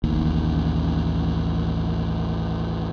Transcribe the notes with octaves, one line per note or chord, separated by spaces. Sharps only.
A1 D#2